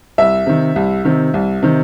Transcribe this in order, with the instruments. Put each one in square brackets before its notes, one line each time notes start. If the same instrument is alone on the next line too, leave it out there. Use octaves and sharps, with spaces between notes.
[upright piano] C2 E5
C3 D#3
C2
C3 D#3
C2
C3 D#3